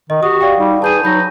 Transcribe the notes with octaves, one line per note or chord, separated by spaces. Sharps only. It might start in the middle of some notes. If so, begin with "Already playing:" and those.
D#3 D#5
F#4 G4 D#6
D5 F5 G5
G3 D#4
G#4 B4 A5 G6 D#7
F#3 D#4 B5 G6 A#6